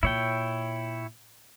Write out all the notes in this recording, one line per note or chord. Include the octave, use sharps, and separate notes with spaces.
A#2 E4 C#5 G5